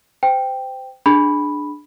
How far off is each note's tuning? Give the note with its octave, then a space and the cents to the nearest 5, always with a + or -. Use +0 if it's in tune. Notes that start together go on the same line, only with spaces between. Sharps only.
C5 -30 G5 +0
D4 +10 G#4 +0 B5 -5